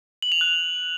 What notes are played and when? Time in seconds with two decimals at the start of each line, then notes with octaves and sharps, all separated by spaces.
0.22 F#7
0.32 F7
0.41 F#6